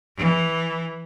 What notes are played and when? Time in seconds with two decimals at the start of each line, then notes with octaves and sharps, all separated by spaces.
0.17 E3